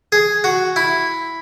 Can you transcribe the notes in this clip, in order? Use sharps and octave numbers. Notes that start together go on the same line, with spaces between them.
G#4
F#4
E4